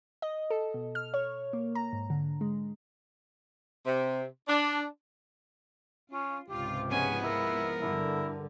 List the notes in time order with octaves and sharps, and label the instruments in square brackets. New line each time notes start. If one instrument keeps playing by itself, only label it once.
[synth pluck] D#5
A4
B2
F6
C#5
A#3
A#5
G#2
D3
G#3
[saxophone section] C3
D4
[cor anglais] C#4 [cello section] F4
[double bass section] C#2 G#2 C3 [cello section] F4 [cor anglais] G4
[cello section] F3 G#3 B3 [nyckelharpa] C#4 G#5
[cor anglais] E4 [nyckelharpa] A#4
[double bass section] G2 D3 [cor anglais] E4